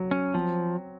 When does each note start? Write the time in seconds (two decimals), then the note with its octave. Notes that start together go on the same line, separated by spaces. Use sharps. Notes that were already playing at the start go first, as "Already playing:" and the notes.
Already playing: F#3
0.11 C#4
0.34 F3 C4